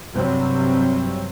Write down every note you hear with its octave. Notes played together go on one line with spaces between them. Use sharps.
G2 C3 F#3 G3 C4